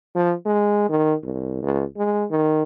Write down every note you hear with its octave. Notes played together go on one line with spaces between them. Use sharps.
F3
G#3
D#3
C2
C#2
G#3
D#3